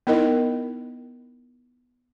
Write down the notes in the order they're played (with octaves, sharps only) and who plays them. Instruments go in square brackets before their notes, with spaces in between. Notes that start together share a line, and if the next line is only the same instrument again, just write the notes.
[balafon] B3 D#4 E4 A#4 D#5